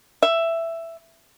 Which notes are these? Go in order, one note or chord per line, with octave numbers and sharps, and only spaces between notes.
E5